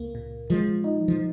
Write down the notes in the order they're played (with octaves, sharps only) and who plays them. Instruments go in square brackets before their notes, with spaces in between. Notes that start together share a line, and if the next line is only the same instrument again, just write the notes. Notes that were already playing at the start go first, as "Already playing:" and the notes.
Already playing: [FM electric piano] C#2 A#3
A#2
[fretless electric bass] F3 [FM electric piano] G#3
[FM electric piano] D#4
[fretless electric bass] F3